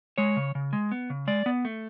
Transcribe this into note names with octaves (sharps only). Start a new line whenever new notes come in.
G#3 C#5
C#3
C#3
G#3
B3
C#3
G#3 D5
B3
A3